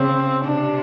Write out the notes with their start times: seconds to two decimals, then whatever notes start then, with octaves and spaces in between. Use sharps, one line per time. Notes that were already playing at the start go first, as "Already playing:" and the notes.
Already playing: C#3 C4
0.45 C3 D4